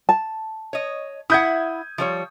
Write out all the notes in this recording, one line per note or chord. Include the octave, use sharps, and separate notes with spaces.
A5
C#5 D#5
E4 E5 F#5 D#6 G6 G#6
F3 G3 C#5